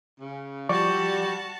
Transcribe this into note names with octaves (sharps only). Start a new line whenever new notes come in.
C#3
F3 G3 F#4 D5 A5 C#6